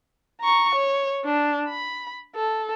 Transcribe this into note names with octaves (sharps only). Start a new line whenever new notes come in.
A#5 C#6
C#5
D4
B5
A4